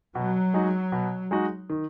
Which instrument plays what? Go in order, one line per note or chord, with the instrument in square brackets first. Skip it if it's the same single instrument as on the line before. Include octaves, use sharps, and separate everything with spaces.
[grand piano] B2 [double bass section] F#3
[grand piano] G#3 D#4 F#4
B2
G#3 D#4 F#4
D#3